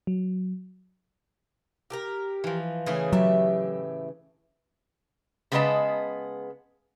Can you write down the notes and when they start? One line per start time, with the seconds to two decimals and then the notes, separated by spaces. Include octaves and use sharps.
0.07 F#3
1.90 G4 A4 A#4
2.44 E3 F3
2.86 C#3 E3 A3 G#4
3.13 A2 F#3 G4 E5
5.52 C#3 G#3 B3 B4 D#5 A5